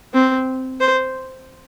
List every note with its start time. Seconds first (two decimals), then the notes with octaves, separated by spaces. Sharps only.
0.14 C4
0.80 C5